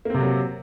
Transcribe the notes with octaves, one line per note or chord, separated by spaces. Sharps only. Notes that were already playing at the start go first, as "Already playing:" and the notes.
C3 F#3 A#3 C4